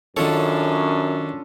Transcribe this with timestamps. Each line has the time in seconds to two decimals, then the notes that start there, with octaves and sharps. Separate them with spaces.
0.17 F#2 D#3 C#4 D4 F4 A4 C#5